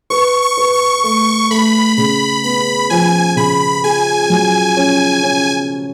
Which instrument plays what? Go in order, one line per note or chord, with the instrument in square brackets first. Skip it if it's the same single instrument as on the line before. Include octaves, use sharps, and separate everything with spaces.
[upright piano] B4 [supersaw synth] C#6
[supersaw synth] C#6
[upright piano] B4
[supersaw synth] C#6
[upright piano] A3 [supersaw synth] C#6
[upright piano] A3 [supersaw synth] B5
[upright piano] C#3 [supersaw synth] B5
[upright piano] B3 [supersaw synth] B5
[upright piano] F3 [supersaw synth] G#5
[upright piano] C#3 [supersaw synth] B5
[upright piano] G#4 [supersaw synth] G#5
[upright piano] F#3
C#4
C#4